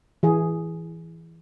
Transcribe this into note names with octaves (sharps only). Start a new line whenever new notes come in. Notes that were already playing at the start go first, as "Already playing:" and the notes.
E3 G#4